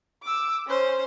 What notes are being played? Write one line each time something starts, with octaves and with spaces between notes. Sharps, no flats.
D6 E6
C#4 C5